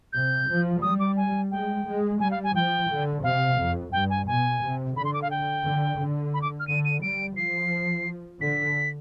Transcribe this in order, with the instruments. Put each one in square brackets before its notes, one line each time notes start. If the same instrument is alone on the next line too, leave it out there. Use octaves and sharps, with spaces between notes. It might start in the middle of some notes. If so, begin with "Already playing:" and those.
[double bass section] C3 [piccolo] G6
[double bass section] F3
[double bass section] G3 [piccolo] D#6
[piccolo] D6
G#5
[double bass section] G#3 [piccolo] G5
[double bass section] G#3
[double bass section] G3 [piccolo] G#5
[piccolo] F5
G#5
[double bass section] F3 [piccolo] G5
[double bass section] D3
[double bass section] C3 [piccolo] F5
[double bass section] F2
[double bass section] G2 [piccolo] G5
[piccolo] G#5
[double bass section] B2 [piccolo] G#5
[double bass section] C3
[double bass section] D3 [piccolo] B5
[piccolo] C6
D6
F5
G5
[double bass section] D3
D3
[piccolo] B5
D6
F6
[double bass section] D3 [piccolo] D#7
[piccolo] D#7
[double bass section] G3 [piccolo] D7
[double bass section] F3 [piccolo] C7
[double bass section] D3 [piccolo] B6